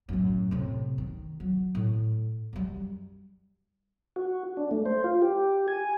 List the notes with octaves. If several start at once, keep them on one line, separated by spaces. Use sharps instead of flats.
F#2 A2
A2 C3
D#3
F#3
A2
F#2 G3
F#4
D4
A3
C5
F4
G4
G#5